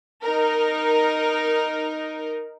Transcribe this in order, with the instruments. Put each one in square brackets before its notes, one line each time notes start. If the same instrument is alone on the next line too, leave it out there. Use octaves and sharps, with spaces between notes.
[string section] D#4 A#4